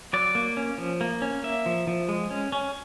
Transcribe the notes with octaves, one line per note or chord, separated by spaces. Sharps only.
F#3 D5
A#3
C#4
F3
A#3
C#4
A#3 E5
F3
F3
G#3
C#4
C#4